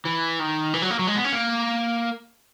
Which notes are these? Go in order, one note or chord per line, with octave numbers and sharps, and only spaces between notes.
E3
D#3
E3
F#3
A#3
F#3
G#3
B3
C#4
A#3